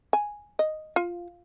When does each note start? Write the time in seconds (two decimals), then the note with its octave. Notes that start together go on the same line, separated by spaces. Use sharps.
0.13 G#5
0.59 D#5
0.96 F4